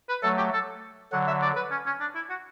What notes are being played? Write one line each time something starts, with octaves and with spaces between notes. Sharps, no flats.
B4
F#3 A3 A4
G4
A4
D3 F#3 F#5
E5
D5
B4
C#4
C#4
D4
E4
F#4